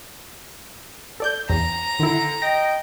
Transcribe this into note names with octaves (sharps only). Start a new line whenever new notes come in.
A4 D5 G6
E2 A#5
D3 D#3 E4
D#5 G5 A#6